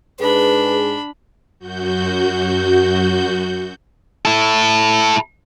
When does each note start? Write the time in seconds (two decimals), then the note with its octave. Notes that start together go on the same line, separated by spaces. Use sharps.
0.20 G#2 D4 G#4 B4 B5
1.59 F#2 F#4 G6
4.25 E4 A4